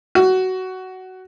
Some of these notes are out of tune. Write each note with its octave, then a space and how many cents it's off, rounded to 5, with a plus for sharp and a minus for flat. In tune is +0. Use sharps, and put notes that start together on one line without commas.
F#4 +15